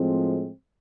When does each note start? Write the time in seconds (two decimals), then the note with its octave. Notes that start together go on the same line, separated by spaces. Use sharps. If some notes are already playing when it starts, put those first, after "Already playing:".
Already playing: A2 F3 G#3 C4